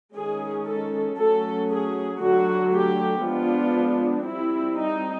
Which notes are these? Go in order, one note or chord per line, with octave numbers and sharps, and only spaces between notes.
D#3 G#3 C#4 G#4
A4
F#3 A3 C#4 A4
G#4
D3 F#3 A3 F#4
G4
F3 G#3 B3 D4 F4
G3 C4 E4
D#4